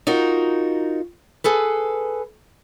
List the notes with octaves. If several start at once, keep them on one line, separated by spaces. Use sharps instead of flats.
D#4 F4 F#4 A#4
G#4 A4 B4